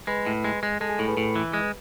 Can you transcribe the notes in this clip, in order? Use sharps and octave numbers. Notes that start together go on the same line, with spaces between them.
G#3 B4 B5
A2
G#3
G#3
G#3 A4 A5
G#4 G#5
A2 A4 A5
B4 B5
A2
E3
G#3